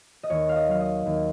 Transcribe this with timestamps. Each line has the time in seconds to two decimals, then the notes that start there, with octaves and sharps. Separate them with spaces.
0.23 D#5
0.30 D#2 C#5
0.49 F5
0.56 D#5
0.69 F#3 F5
0.81 D#5
1.06 D#2